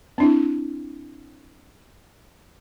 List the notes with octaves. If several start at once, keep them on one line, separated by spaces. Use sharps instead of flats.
C4 D4 E4